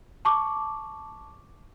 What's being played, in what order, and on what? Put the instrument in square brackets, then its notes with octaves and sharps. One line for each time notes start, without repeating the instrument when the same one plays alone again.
[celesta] A5 C#6 D6